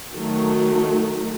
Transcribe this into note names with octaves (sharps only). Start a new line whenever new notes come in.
D#3 F#3 A3